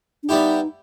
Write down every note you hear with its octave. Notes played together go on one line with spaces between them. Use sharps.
D4
G3 B3 D#4 E4 G4